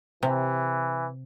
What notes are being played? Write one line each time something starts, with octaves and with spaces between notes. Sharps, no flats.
C3 E3